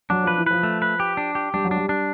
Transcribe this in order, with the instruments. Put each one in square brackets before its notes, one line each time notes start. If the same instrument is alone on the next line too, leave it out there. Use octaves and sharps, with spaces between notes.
[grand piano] F#3 [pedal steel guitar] D4
[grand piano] F3 [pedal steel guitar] B4
[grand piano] E3
[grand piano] F3 [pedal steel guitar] B4
[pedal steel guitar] A3
B4
G4
D4
G4
[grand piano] G3 [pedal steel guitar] D4
[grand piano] F#3
[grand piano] G3 [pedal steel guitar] D4
[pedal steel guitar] D4